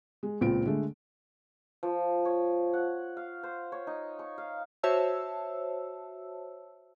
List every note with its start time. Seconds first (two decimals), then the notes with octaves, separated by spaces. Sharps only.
0.23 G#3
0.41 C#2 A#2 C4 F4 D7
0.66 D3 G#3 A3
1.83 F3
2.25 C#5
2.74 F#5
3.17 F5
3.43 C5
3.72 C#5
3.87 D#4
4.19 C#6
4.38 F5
4.83 F#4 C5 C#5 E5 A5 E6